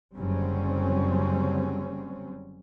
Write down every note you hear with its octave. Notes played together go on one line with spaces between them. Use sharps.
F#1 D3 F#3 G3 C4 C#4